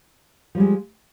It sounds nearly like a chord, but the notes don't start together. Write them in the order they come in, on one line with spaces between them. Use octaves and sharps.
F3 G3 G#3